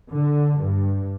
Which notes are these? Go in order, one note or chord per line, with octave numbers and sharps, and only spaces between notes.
D3
G2